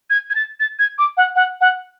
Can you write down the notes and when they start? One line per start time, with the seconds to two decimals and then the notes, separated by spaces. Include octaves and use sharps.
0.10 G#6
0.30 G#6
0.35 A6
0.60 A6
0.79 G#6
0.98 D6
1.17 F#5
1.36 F#5
1.61 F#5